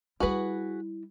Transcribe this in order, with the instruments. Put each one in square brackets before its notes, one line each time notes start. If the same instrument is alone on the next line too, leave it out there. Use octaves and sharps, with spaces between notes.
[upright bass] G3 E4 [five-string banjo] F#4 G#4 B4